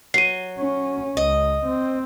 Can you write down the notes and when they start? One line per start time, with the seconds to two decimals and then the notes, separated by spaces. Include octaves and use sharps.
0.14 F#3 C7 D#7
0.59 C#4
1.17 C#2 D#5
1.66 C4